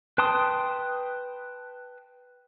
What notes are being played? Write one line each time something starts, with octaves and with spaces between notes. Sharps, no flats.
B4 G5 A5 C6 D#6